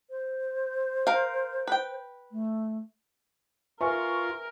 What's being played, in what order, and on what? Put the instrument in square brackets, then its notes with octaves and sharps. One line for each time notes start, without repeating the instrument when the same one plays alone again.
[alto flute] C5
[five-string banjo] A#4 F5
B4 G5
[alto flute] A3
[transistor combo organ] F4 [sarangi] A#4 [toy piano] B4 E5 G#5 [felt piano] C#6